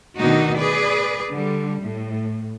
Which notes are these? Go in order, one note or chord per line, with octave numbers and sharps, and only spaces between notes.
D2 B2 D#3 D4 D#4 F#4
G#4 B4 D5
D3 G3
A2